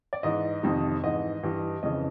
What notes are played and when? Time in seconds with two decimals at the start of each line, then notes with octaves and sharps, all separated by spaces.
0.13 D5
0.23 G#2 E3 D#5
0.63 F2 C3 D#3
1.03 G#2 E3 D#5
1.43 G2 E3
1.83 F2 C#3 E3 D#5